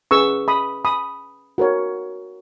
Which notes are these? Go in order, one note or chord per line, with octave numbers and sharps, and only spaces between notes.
C#4 G#4 B4 C#6 E6
B5 D#6
B5 D#6
F#4 A#4 C#5